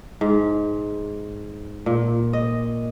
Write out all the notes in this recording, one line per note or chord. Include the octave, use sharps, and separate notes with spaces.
G#2
A#2
D#5